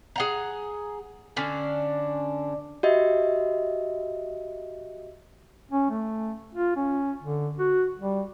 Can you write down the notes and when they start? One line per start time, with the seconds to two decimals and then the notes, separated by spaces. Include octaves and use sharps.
0.16 G#4 F#5 A#5
1.36 D3 C#4 D4
2.83 F#4 G4 D#5 E5
5.71 C#4
5.90 A3
6.55 F4
6.76 C#4
7.23 D3
7.59 F#4
7.99 G3